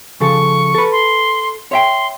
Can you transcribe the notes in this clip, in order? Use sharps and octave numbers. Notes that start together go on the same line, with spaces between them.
C#3 F3 A4 C#6
A4 B4
C6
C#5 E5 G5 C6